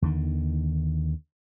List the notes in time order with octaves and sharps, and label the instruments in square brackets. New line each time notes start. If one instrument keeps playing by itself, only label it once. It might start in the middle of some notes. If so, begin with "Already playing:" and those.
[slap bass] D#2 D3 D#3